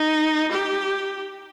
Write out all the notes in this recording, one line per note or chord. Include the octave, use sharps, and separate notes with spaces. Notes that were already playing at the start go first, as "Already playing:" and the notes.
Already playing: D#4
G4